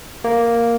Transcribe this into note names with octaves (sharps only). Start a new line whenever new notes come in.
A#3